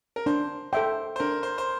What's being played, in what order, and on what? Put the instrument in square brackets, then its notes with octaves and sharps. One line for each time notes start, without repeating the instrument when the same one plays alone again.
[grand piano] A#4
[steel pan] D4 [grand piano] C5
[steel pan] A4 E5 G5 [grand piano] C5
[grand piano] C5
[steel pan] D4 [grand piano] A#4
[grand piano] C5
C5